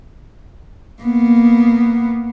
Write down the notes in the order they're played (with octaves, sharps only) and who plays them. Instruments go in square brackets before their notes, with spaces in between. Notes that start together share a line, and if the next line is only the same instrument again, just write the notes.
[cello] A#3 B3